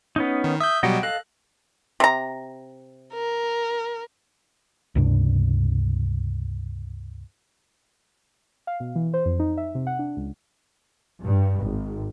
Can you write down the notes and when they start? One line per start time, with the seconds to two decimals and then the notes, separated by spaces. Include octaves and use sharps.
0.16 B3 C#4 D#4
0.44 D#3
0.60 E5 D#6 G6
0.83 B2 F#3 G3 D#5 F#5 G5
1.03 A4 D#5 F5 F#6
2.00 C3 A#5
3.13 A#4
4.96 C#2 G2 C3 D4
8.67 F5
8.80 B2
8.96 E3
9.14 C5
9.26 F2
9.39 D#4
9.57 E5
9.75 C3
9.87 F#5
9.99 D4
10.17 C#2
11.22 G2
11.62 G#1